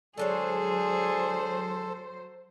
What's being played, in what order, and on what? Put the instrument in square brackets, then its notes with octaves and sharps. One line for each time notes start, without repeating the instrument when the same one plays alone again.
[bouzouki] D3 G#3 C#5 [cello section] F#3 C5 [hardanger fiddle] G#4 [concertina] A4